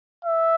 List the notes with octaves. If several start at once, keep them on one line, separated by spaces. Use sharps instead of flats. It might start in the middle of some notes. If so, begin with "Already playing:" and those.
E5